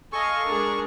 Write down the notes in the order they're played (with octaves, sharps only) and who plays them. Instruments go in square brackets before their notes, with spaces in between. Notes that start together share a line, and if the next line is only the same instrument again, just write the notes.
[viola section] A4 D#5 F5 [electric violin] G#5 [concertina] C#6
[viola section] G#3 D4 [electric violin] G#4 A#4